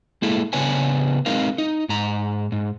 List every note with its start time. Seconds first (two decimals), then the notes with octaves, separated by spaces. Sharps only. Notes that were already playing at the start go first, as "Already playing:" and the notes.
0.22 G#3 A#3 E4 A4
0.53 C#3 B3 D4 B4 C#5 G#5
1.26 G#3 C4 D#4 A#4 F5
1.58 D#4
1.89 G#2 A#5
2.52 G#2